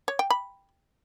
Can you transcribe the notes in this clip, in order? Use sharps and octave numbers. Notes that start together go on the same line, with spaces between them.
C#5
G5
B5